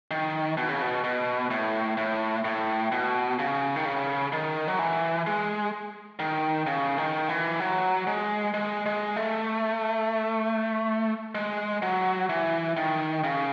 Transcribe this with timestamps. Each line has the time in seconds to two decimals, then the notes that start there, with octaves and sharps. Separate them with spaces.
0.11 D#3
0.57 B2
0.69 C#3
0.82 B2
1.04 B2
1.50 A2
1.97 A2
2.45 A2
2.92 B2
3.39 C#3
3.76 D#3
3.85 C#3
4.33 D#3
4.68 F#3
4.79 E3
5.27 G#3
6.19 D#3
6.66 C#3
6.98 D#3
7.29 E3
7.60 F#3
8.07 G#3
8.54 G#3
8.86 G#3
9.16 A3
11.35 G#3
11.82 F#3
12.29 E3
12.77 D#3
13.24 C#3